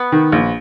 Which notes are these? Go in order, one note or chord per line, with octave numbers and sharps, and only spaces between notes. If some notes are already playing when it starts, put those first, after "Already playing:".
Already playing: B3
D#3
A#1